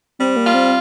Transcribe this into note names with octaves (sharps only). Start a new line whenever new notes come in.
G3 C4
A#3
F4
C4